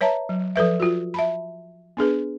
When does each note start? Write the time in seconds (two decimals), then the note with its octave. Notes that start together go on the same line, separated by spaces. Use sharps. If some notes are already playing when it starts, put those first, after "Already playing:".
0.01 B4 C#5 E5 A5 A#5
0.29 F#3
0.56 F3 A4 B4 E5
0.80 F4 F#4
1.14 E5 A5 B5
1.97 B3 D4 G#4 B4